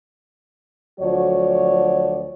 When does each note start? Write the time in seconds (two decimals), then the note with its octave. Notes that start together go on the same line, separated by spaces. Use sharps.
1.00 D2 F3 F#3 F#4 C#5 D5